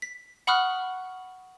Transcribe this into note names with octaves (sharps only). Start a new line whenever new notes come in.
B6
F#5 B5 C#6 D#6 F6 F#6